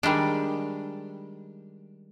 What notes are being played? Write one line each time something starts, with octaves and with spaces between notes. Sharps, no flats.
D#3 G3 G#3 D4